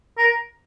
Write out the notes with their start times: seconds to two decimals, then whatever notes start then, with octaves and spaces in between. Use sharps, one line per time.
0.18 A#4